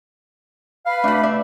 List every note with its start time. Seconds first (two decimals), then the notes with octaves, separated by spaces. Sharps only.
0.86 B4 F5 B5
1.04 A3 D4 F#4
1.23 D5 E5